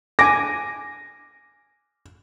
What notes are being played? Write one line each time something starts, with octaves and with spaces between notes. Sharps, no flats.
G#5 D6 A#6